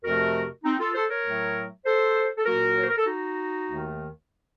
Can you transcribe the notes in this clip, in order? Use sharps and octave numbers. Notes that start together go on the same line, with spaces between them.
F2 C3 F3 A3 F#4 A#4
C4 D#4
F4 A4
A4 C5
A#4 C#5
A2 F#3 A3
A4 C5
A4
A#2 F#3 A#3 F#4 A#4
C#5
C5
A#4
A4
D#4 F#4
D#2 D#3 A3